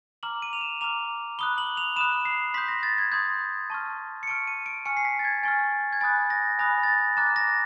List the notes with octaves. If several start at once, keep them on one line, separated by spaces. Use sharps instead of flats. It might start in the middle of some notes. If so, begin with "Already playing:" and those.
A#5 D6 F6 F#7
D#7
F7
E7
A#5 D6 F6 F7
B5 D#6 F#6 G7
F#7
F7
B5 D#6 F#6 E7
C7
C6 D#6 G6 B6
A#6
A6
G#6
C6 D#6 G6 G#6
A5 C#6 F6
C#7
A5 C#6 F6 D7
D#7
D7
G#5 C#6 F6 C#7
C7
B6
A6
G#6
G#5 C#6 F6 A6
G#6
G#5 B5 D#6 F#6 A6
A#6
G#5 B5 D#6 F#6 A#6
A6
A#6
A#5 D6 F#6 A6
A#6